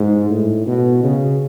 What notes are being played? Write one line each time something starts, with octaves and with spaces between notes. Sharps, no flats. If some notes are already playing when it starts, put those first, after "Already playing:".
Already playing: G#2
A2
B2
C#3